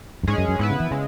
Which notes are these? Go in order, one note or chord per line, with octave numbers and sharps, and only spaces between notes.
F#2
G#2 G#3 C#4 G#4
F#2
F#2
G#2 B3 E4 B4
C#3
E3
C#3 G#3